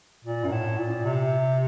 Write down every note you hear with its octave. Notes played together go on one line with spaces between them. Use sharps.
A#2
F#2
A2
A#2
C3